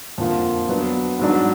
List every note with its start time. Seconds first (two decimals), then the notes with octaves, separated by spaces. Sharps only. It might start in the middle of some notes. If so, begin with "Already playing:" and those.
0.18 F2 D3 F3 A#3 F4
0.69 F#3 B3 D4
1.19 G#2 F#3 D4